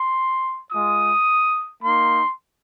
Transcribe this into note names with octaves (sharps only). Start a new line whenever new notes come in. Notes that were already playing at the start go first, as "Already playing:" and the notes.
Already playing: C6
G#3 F4 D#6
A#3 D#4 C6